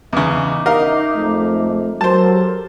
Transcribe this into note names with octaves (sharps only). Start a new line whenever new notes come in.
E2 C#3 D#4 E5 D6
A#4 D#5 F5
F2 G#3 A3
F#3 G4 A4 A#4 C5 A5